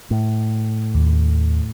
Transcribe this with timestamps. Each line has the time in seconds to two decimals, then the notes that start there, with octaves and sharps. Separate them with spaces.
0.11 A2
0.95 D#2